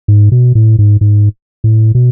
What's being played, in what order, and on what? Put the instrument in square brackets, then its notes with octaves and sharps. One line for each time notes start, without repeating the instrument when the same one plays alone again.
[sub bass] G#2
B2
A2
G#2
G#2
A2
B2